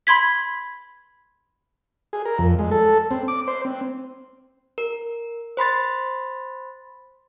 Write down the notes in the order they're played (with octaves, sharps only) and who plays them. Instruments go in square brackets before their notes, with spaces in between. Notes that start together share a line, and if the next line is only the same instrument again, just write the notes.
[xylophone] B5 C6 G#6 B6
[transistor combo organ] G#4
A#4
F2
G#3
A4
C4
D6
C5
C4
[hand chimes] A#4
C5 B5 C6 A6